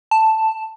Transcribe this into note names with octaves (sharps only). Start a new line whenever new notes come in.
A5